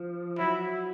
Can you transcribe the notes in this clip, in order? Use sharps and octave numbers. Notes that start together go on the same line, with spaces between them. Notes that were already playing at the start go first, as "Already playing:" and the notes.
Already playing: F3
F#3 E4